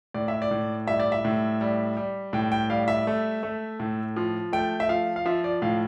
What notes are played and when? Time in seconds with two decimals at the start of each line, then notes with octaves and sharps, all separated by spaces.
0.14 A2 D5
0.28 E5
0.42 D5
0.51 A2
0.87 G3 E5
1.00 D5
1.12 E5
1.25 A2
1.61 G3
1.97 G3
2.33 A2 G5
2.52 G5
2.70 G3 F5
2.88 E5
3.07 A3
3.43 A3
3.80 A2
4.16 F3
4.53 A3 G5
4.80 E5
4.89 F3 F5
5.16 F5
5.26 F3 E5
5.44 D5
5.62 A2 F5